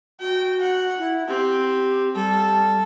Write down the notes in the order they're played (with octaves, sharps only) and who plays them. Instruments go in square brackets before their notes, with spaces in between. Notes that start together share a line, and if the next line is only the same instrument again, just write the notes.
[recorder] F#4 [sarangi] G5
[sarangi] F#5
[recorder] E4
[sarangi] C4 [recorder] G4
[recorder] G3 [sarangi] A4